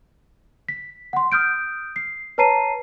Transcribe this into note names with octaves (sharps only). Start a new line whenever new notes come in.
B6
F#5 C6
D#6 F6 G6 D7
C7
B4 C#5 A5 A#5 C7 D#7